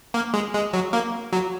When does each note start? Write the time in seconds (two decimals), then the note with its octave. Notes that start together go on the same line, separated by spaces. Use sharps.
0.14 A#3
0.34 G#3
0.54 G#3
0.73 F#3
0.93 A#3
1.33 F#3